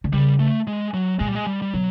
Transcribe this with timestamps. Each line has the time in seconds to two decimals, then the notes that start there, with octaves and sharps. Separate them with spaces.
0.04 D3
0.13 C#3 G3
0.40 A3
0.67 G#3
0.94 F#3
1.19 A#2 G#3
1.28 G3
1.35 G#3
1.47 G3
1.62 G3
1.74 B2 F#3